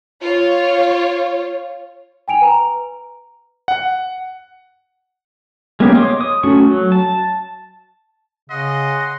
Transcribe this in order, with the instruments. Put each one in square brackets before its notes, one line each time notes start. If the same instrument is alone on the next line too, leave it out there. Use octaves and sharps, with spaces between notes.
[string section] F4 C#5
[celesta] G5 G#5 D7 F7
B4 A#5
[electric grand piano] F#5
[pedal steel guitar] G#3 A#3 B3 C#4 G4
C#5 D#5 C6 D6
D#6
A3 C#4 F#4 C#6
F#3
A5
[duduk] C#3 [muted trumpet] D#5 [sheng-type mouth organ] F#5 C6